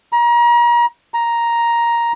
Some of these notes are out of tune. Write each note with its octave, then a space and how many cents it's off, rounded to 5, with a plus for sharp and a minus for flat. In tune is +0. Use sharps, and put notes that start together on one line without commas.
A#5 +35
A#5 +5